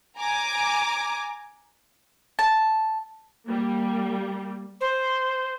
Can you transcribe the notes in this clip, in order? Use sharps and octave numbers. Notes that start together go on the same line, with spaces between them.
G#5 A#5 D6
A5
G3 A#3
C5